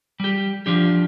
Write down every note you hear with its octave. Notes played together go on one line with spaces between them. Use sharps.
G3 G4
F3 D4 G4